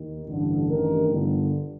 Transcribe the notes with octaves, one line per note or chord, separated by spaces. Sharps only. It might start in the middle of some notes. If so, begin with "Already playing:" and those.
Already playing: D#2 D#3
A1 G2 D3
A1 G2 D#3 A#4
G1 G2 D3